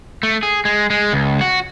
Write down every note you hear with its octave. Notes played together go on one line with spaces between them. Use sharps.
A3
G#4
G#3
G#3
C#2
F#4